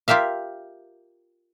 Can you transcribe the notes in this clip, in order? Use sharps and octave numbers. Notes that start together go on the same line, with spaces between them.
F4 G4 A#4 E5 F5